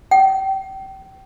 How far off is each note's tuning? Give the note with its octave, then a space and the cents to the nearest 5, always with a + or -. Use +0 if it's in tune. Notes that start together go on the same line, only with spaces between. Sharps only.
G5 -30